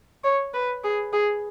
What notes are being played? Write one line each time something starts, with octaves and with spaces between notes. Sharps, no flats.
C#5
B4
G#4
G#4